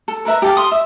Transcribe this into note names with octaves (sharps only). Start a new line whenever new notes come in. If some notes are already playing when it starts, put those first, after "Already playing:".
A4
A#4 B4 E5 A#5
G4 A4 F5
C6 D#6
E5